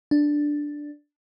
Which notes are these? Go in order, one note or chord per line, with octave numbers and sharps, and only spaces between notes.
D4